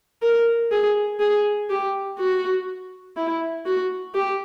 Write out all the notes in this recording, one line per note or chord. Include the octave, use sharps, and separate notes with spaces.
A#4
G#4
G#4
G4
F#4
E4
F#4
G4